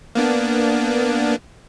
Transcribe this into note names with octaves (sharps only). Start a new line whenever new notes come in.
A#3 B3 D4